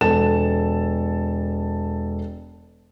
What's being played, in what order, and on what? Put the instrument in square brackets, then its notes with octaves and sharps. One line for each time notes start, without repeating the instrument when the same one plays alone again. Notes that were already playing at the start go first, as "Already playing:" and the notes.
[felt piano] E1 A4 A5 E7